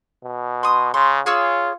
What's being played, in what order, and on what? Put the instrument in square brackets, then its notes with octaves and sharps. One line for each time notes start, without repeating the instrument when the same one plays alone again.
[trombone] B2
[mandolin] C6 D#6
[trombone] C#3 [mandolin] C6
[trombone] F4 [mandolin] G#4 C#5 E6